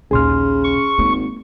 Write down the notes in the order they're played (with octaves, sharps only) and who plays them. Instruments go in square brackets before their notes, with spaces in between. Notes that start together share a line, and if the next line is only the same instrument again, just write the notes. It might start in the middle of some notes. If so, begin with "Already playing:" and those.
[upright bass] A#1 D#2 [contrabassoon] C#3 [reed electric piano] G#4 C6 F6
[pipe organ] C#6
[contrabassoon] G#1 [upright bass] G#3 A#3